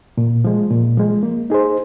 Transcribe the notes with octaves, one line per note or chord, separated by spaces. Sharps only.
A#2
F3 G#3
A#2
F3 G#3
A#3
D#4 G#4 C5